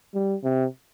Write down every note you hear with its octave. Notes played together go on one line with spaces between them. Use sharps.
G3
C3